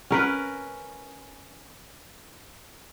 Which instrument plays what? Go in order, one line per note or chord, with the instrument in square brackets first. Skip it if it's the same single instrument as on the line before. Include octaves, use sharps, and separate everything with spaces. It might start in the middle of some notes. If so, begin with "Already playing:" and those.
[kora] C#4 A#4 B4